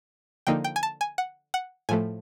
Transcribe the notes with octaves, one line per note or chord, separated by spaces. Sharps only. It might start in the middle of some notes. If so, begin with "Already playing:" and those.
D3 F3 A#3 D#4 G5
G5
G#5
A5
G#5
F#5
F#5
A2 F3 A3 G#5